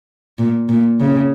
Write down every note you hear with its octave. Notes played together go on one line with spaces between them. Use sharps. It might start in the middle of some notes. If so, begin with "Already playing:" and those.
A#2
A#2
C#3